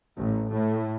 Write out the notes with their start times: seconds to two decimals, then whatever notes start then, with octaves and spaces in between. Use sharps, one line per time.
0.18 A1
0.52 A2